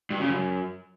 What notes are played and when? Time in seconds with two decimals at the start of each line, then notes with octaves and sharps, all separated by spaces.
0.10 G2
0.20 C#3
0.30 F#2